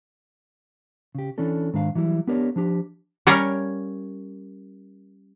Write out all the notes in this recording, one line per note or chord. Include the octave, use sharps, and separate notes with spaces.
C#3 G4
E3 C#4 D4 A4
G#2 D#3 D4 F5
E3 F#3 G3 E4
B3 D4 G4 A#4 C#5 D5
F3 D4 G4
G3 C#4 A#4 C#5 F5 G5